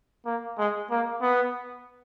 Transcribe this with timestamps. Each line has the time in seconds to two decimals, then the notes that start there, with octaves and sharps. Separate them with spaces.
0.25 A#3
0.58 G#3
0.90 A#3
1.21 B3